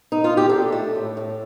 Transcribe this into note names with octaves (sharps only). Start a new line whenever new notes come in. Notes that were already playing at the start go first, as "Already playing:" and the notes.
D#4
F4
G4
D4 A4
A3
A2
A2